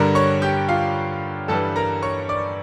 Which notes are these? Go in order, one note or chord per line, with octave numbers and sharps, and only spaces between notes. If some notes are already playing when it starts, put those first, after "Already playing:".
Already playing: G2 D3 G3 A#4 A#5
C#5 C#6
G4 G5
F4 F5
G2 E3 G3 A4 A5
A#4 A#5
C#5 C#6
D5 D6